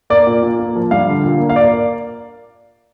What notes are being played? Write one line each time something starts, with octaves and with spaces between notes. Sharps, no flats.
A#3 D5
A#2
A#2
A#3
F3
G3 F5
D3
A#2
A#3
F5
A#3 D5